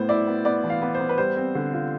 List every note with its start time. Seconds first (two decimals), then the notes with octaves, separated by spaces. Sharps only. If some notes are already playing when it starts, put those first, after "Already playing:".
Already playing: A2 B3 C5
0.09 E4 D5
0.27 B3
0.45 B3 D5
0.64 E3
0.70 F5
0.82 B3
0.95 C5
1.00 B3
1.09 B4
1.18 G3 C5
1.37 C4
1.55 D3
1.73 F4